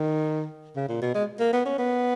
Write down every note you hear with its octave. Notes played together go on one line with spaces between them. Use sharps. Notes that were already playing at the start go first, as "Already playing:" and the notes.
Already playing: D#3
C#3
A#2
B2
G#3
A#3
B3
C#4
B3